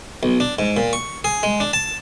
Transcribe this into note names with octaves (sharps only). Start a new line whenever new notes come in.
B1
D4
G#2
A#2
C#6
G#4
G#3
D4
A5